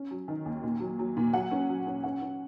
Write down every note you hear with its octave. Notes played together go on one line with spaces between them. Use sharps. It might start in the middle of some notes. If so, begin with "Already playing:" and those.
Already playing: C#4
F#3
D#3
D#2
A#2
F#3
F#3
A#2
F#3 F#5
C#4
F#3
C#4
C#4 F#5
C#4